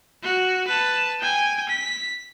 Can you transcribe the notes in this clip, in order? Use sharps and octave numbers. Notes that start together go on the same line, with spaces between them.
F#4
B4 A5
G5 G#5
B6